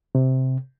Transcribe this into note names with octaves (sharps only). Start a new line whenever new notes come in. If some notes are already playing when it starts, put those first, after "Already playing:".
C3